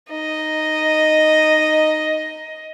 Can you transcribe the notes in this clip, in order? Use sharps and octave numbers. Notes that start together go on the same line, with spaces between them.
D#4 D#5